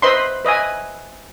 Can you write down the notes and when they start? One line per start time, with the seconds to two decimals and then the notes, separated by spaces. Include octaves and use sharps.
0.02 B4 C5 D#5 E5 B5 C6
0.45 B4 D#5 E5 G#5